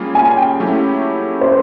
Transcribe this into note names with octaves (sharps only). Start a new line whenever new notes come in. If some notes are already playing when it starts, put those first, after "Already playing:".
Already playing: G3 A#3 C#4 F4 G#4
G#5
G5
F#3 A3 C#4 E4 G4
C5